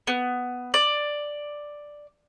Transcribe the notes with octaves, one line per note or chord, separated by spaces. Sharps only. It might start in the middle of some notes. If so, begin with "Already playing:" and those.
B3
D5